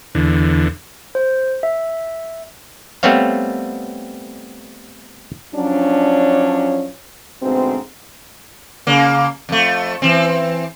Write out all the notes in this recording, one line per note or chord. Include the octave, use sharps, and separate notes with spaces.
E2 D3
C5
E5
G3 A3 B3 C4 C#5 F5
F3 F#3 C#4 D4
D2 G#2 B2 C4
C#3 A#3
F2 A3
E3 C4